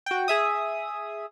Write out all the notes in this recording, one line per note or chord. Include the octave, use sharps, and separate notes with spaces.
F#4 G5
G#4 E5 D#6